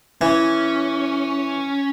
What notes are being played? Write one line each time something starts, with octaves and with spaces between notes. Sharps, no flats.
E3 C#4